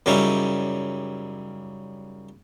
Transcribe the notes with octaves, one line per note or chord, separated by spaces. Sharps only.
F#2 C#3 G3 C#4 D#4 E4